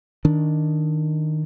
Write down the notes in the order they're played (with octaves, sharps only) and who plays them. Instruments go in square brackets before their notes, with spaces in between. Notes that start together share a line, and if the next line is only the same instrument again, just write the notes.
[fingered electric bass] D#3 D4